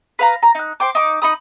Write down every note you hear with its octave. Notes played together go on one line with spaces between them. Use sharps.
B4 F5 A#5
A#5
D#4 F#6
C5 G5 D6
D#4 D6
D#4 B5 D#6